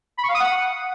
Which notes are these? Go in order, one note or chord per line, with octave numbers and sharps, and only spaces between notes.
B5
C#6
F5
D#6
F#5